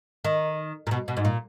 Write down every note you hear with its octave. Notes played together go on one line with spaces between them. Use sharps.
D#3
A#2
B2
B2
G#2
A#2